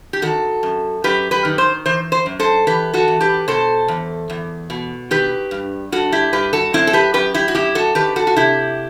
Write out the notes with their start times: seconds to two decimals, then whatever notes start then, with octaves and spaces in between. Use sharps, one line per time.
0.13 G4
0.22 D#3 F#4 A4
0.63 F#2
1.04 F#2 G4 B4
1.31 G4 B4
1.45 D#3
1.58 C5
1.86 E3 C5
2.12 C5
2.26 F#2
2.39 A4 C5
2.67 E3 G4 B4
2.93 F#4 A4
3.08 E3
3.21 G4 B4
3.48 B2 A4 C5
3.88 E2
4.30 E2
4.70 B2
5.11 D#3 G4 B4
5.51 G2
5.92 G2 F#4 A4
6.12 E4 G4
6.33 G2 G4 B4
6.53 F#4 A4
6.73 F#2 C4 E4
6.87 A4
6.93 G4 B4
7.14 F#2 G4 B4
7.34 E4 G4
7.48 F#4
7.55 F#2 E4 G4
7.75 F#4 A4
7.95 D#3 G4 B4
8.16 F#4 A4
8.27 F#4
8.36 C3 E4 G4